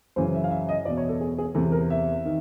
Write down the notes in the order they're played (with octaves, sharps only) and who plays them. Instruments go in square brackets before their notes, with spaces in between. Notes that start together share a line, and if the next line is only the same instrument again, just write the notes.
[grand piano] F#2 C#3 E3 C5
E5
F5
E5
D#5
E2 B2 D5
C#5
A4
G#4
G#4
E2 C3 E3 A4
A#4
E5
D#3